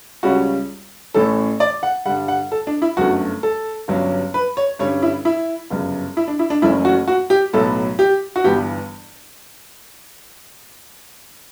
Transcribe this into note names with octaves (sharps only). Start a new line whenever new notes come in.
C#2 C#3 G3 C#4 F#4
A1 A2 E3 A3 C#4 A4
D5
F#5
G2 D3 G3 F#5
F#5
A4
D4
E4
G1 F#2 D3 A3 F#4
A4
G1 G2 F#3 C#4
B4
C#5
G2 D3 G3 C#4 C#5
E4
E4
G1 F#2 C#3
E4
D4
E4
D4
F#1 F#2 E3 A3 C#4 E4
F#4
F#4
G4
B1 A2 F#3 B3 A4
G4
F#4
G1 G2 E3 B3 G4